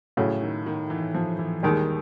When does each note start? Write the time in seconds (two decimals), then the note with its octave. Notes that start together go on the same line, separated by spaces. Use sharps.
0.17 A2 C#3 F#3 A3 C#4
0.42 D#3
0.66 D#3
0.90 E3
1.14 F3
1.39 E3
1.63 D#2 D#3 G3 G#3